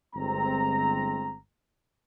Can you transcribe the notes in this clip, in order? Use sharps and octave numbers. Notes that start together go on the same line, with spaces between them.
G1 G#3 C4 A#5